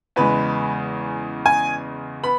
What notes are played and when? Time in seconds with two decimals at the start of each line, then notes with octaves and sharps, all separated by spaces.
0.16 E2 C#3 G#3 B4
1.46 G#5
2.23 B3 B5